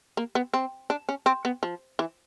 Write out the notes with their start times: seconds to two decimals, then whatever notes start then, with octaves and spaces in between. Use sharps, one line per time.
0.17 A#3
0.35 B3
0.54 C4
0.90 D4
1.09 C#4
1.26 C4
1.45 B3
1.63 F3
1.99 E3